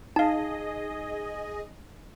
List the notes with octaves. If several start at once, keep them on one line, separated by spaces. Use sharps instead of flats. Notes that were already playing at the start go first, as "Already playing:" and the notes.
D#4 G#4 D#5 F5 A5